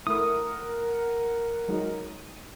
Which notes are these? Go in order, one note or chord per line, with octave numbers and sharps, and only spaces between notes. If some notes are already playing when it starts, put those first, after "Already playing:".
A3 E4 A#4 F#5 D#6
F#3 G#3 D#4